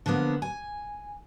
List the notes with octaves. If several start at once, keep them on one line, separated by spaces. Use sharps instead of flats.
D3 F3 A#3 B3
G#5